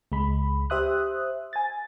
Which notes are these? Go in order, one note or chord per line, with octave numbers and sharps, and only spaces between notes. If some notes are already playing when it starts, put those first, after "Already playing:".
C#2 G#3 B5
G4 C5 E5 D#6 F#6
G#5 A6